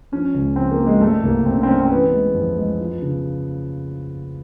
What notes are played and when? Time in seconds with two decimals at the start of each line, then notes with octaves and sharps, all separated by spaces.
0.12 F3 C#4
0.34 C#2
0.56 F3 C4
0.71 A#3
0.78 F3
0.87 G#3
1.01 G3 A3
1.23 C2 A#3
1.46 C2 C4
1.57 C#4
1.63 C4
1.67 G3 C#4
1.79 C4
1.90 E3 B3
2.12 G#3
2.34 F2
2.56 G#3
2.79 F3
3.02 C#3